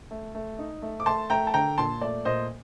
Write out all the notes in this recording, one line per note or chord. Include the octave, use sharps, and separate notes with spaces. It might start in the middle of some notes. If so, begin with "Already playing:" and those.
A3
A3
D#4
A3
D6
A3 A5 C6
A3 G5 A#5
A5
D3 G5 A#5
A#2 A5 C6
A3 D5
A#2 C5 D#5